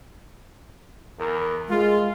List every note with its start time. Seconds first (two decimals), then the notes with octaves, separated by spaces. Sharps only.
1.19 E2 A#4
1.69 G#3 F4